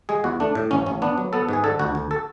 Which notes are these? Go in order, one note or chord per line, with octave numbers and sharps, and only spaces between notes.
G#3 G#4
E2 F#4
A3 D4
A2
A1 C#4
A1 C#4
B3 D4
F#3
B3 A4
G#2 G#4
D3 A4
D2 F#4
D2
A4